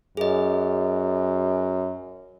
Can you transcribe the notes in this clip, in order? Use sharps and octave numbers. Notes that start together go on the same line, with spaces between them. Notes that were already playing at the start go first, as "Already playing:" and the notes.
F#2 G#4 D#5